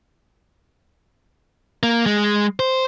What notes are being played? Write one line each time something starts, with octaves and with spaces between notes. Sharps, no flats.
A#3
G#3
C5